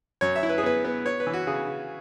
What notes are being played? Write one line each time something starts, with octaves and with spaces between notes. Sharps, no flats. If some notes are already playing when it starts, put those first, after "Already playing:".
F#2 C#5
E5
E4
B4
G#4
B3 B4
B3
B3 C#5
B4
E3
F#4
C#3 G#4
C#3